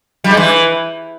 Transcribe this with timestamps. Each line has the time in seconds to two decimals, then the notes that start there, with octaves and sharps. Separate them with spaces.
0.24 G3
0.31 G#3
0.37 E3